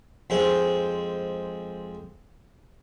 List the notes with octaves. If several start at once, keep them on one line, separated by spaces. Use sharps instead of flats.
F2 G#3 C5